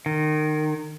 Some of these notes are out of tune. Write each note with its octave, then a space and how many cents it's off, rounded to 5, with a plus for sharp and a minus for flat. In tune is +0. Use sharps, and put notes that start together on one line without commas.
D#3 -25